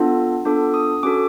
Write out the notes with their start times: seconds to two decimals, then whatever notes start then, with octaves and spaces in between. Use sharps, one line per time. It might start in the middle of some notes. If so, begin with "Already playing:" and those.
Already playing: B3 D4 F4 A4
0.45 B3 D4 F4 A4 D6
0.74 D#6
1.03 C#4 F#4 A4 D6